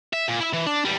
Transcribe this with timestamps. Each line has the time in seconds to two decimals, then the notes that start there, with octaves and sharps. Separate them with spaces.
0.13 E5
0.28 A#2
0.40 E4 E5
0.53 E3
0.66 D4
0.85 E2 G3